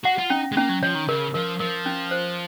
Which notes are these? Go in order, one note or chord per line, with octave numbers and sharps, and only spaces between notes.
F#4 F#5
F4
C#4 D#4
G#3
A#3 C#4
F#3
F3 C#5
D#3
C#3 A#4
F3 A#4
F3 A#4
C#4
C5